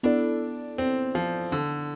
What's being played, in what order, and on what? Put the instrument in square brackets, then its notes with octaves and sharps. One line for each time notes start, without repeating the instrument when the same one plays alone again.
[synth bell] B3 E4 A4 D5 [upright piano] D4
[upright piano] C4
F3
D3